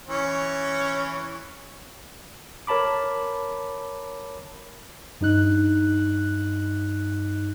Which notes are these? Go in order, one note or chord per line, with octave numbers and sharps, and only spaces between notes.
E3 C#4 C#5
A#4 C#5 A5 B5 D6
G2 D#4 F#6